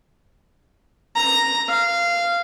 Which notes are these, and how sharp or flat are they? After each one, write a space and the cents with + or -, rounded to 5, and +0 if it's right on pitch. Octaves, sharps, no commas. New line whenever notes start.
A#5 +0
F5 -15